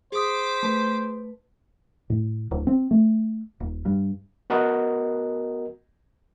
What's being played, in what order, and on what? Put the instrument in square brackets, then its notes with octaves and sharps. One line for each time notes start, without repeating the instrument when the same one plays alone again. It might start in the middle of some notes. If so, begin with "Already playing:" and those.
[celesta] G#4 D#6 [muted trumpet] C5 [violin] D6 B6
[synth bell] A3 B4
[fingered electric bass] A2
D1
C4
A3
D#1
G2
[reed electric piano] B3 F#4 A#4 D#5 F#5